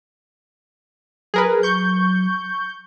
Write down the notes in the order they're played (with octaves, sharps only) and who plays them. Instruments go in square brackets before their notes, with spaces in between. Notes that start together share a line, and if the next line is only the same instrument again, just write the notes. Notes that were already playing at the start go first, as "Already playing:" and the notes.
[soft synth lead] F#3 [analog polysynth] G#4 A#4 B4
[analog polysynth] C#6 G6